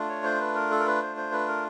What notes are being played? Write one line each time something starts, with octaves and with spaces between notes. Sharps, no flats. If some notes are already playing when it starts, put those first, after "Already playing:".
Already playing: A3 D4 F4
C#5
C5
B4
A#4
A4
A#4
B4
C5
C5
B4
A#4